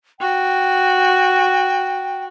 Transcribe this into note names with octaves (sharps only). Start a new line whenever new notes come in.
F#4 G5